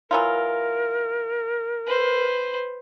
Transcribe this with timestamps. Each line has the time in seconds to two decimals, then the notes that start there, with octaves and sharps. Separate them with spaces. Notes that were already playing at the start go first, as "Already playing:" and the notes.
0.11 E3 F#3 F4 A#4
1.86 B4 C5